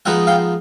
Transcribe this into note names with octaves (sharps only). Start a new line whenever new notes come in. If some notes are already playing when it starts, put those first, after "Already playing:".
F3 G#3 B3 D#4 F#5 G#5
F5 G5